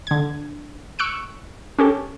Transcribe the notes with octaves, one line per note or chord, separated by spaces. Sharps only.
D3 G#6
C#6 E6 F#6 C#7 D7
C#4 G4 A4